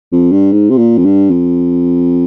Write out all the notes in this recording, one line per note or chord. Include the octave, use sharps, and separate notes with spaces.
F2
G2
G#2
C3
A#2
F2
G2
F2